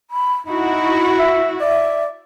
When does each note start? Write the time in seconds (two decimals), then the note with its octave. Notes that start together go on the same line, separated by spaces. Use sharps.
0.11 B5
0.46 D#4 E4 F#4 B5
1.19 E5
1.61 D5 E5